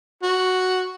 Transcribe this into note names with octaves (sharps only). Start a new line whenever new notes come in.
F#4